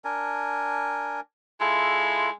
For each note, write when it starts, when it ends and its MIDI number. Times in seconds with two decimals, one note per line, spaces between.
0.04 1.20 62
0.04 1.20 70
0.04 1.20 80
1.60 2.32 56
1.60 2.30 64
1.60 2.30 65
1.60 2.30 69